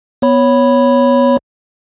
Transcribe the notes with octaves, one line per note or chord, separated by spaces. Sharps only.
B3 C#5 B5